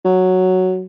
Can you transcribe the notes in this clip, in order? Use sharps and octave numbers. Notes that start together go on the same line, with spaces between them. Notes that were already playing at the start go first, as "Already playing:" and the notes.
F#3